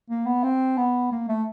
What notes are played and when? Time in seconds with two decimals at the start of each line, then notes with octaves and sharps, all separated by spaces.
0.10 A#3
0.26 B3
0.44 C4
0.77 B3
1.12 A#3
1.28 A3